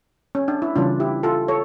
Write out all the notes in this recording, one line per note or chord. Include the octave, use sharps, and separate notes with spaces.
C#4
D4
E4
C#3 E3 G3 C#4 D4 F4
E4 G4
F4 A4
A4 C#5